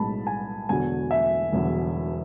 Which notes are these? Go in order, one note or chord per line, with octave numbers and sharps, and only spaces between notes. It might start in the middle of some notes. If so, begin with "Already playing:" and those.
Already playing: B1 A2 G#3 A5 B5
G#5
E1 E2 D3 F#3 G#5
E5
E1 E2 D3 F#3